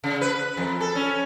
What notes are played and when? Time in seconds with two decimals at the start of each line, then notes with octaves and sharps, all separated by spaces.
0.04 C#3
0.21 B4
0.57 F2
0.81 A4
0.95 C#4